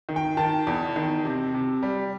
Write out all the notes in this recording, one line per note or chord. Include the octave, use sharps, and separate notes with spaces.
D#3
G5
D#3 A5
E2
D#3
C3
C3
G3